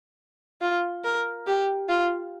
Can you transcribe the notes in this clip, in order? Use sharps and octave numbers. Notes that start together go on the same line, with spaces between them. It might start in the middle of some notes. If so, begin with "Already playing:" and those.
F4
A#4
G4
F4